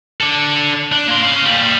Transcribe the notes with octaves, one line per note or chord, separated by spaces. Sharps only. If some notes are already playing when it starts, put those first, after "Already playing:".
D4 A4
D4
A#3 C6
C#4 F5
G3 A#3